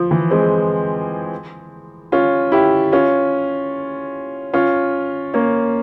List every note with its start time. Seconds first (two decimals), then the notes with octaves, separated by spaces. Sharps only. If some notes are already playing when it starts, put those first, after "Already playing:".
Already playing: F3
0.11 E3
0.31 G#3 C4
2.12 C#4 F4
2.52 E4 G4
2.92 C#4 F4
4.53 C#4 F4
5.34 A#3 C#4